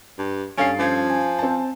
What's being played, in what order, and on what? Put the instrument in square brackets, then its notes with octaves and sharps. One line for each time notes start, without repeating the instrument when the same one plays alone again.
[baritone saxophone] G2
[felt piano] G2 F5 C7 [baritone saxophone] C#4 [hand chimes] A4 A6 D7
[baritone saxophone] F3 [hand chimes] C#4 G#6
[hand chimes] G#5
[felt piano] C4 A5